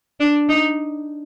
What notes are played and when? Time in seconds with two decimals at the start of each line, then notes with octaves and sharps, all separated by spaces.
0.20 D4
0.49 D#4